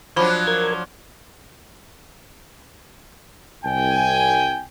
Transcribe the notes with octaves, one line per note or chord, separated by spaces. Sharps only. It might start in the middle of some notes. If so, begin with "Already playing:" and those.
F3 F#3 D4 C5 B5 D6
A#4 G#6
C2 G5 G#5